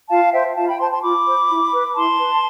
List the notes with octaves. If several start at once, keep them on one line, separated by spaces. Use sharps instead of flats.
F4 F5 A5
C5 E5 G5
F4 F5 A5
G5 B5
C5 A5 C6
A5 C6
F4 B5 D6
C5
E4
B4
E4 A5 C6
B4